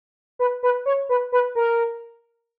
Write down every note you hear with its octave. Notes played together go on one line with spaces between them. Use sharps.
B4
B4
C#5
B4
B4
A#4